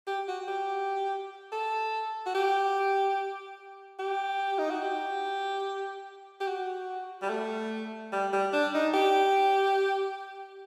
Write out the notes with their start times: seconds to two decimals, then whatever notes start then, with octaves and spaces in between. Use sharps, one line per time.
0.07 G4
0.28 F#4
0.48 G4
1.52 A4
2.26 F#4
2.34 G4
3.99 G4
4.59 D#4
4.70 F#4
4.82 G4
6.40 G4
6.47 F#4
7.22 G3
7.29 A3
8.12 G3
8.33 G3
8.53 D4
8.74 D#4
8.94 G4